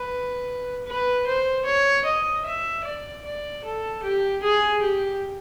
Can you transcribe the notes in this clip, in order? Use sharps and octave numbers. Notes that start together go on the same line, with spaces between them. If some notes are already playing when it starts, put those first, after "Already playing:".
Already playing: B4
B4
C5
C#5
D#5
E5
D5
D5
A4
G4
G#4
G4